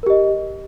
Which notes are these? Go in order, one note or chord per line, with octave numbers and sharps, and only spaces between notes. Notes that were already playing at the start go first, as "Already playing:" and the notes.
G4 A#4 D#5